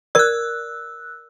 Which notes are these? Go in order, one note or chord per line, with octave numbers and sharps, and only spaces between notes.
A#4 D5 E6 F#6